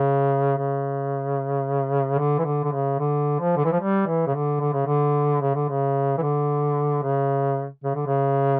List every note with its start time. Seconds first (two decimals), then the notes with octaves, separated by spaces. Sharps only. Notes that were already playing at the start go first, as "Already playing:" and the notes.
Already playing: C#3
0.57 C#3
2.18 D3
2.39 E3
2.45 D3
2.64 D3
2.72 C#3
2.99 D3
3.40 F3
3.57 D3
3.65 E3
3.72 F3
3.80 G3
4.07 E3
4.27 C#3
4.34 D3
4.60 D3
4.73 C#3
4.86 D3
5.41 C#3
5.55 D3
5.69 C#3
6.18 E3
6.22 D3
7.03 C#3
7.84 C#3
7.95 D3
8.07 C#3